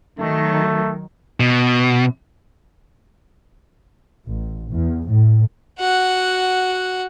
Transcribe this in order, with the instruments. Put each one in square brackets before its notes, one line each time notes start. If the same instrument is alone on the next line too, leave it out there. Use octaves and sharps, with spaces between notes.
[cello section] D#3 F#3 [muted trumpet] A3
[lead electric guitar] B2
[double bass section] A1
E2
A2
[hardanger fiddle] F#4 F#5